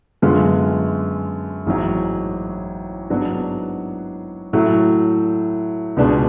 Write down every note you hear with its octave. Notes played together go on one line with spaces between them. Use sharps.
F#2 D3 G#3 B3 F4
A1 G#2 F#3
G#2 F#3 B3 D4 F#4
A2 F#3 A3
C#2 B2 G#3 B3 D4